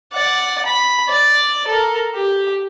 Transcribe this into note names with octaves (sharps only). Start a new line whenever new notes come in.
D5 F#5
B5
D5
A4 A#4
G4